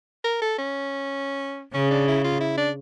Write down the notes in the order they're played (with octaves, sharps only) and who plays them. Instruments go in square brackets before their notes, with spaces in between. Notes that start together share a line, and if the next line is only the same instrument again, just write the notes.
[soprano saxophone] A#4
A4
C#4
[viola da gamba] C#3 [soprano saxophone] C#4
[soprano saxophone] D4
E4
F4
E4
D4